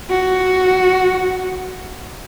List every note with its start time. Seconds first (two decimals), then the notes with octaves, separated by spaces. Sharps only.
0.10 F#4